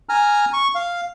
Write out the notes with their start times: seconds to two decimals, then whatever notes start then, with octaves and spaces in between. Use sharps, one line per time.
0.09 G#5 A#5 F6
0.53 C#6
0.75 F5